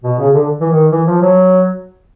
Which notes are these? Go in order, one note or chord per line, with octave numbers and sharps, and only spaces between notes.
B2
C#3
D3
E3
D#3
E3
F3
F#3